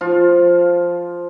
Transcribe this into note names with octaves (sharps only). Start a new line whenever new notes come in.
F3 F4